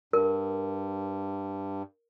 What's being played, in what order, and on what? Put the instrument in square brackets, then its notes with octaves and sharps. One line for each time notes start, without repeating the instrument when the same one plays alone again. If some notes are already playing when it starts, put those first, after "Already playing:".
[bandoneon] G2 [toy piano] A#4